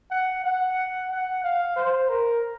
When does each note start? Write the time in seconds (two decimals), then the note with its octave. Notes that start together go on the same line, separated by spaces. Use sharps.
0.11 F#5
0.44 F#5
1.10 F#5
1.43 F5
1.76 C5
2.09 A#4